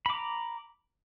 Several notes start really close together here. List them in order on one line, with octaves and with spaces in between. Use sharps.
B5 D6 A#5